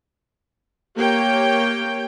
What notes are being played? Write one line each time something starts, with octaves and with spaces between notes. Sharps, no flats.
A#3 G4 C#5 G5